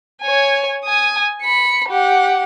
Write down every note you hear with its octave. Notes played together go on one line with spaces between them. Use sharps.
C#5 G#5
G#5 D#6
B5 C#7
G4 F#5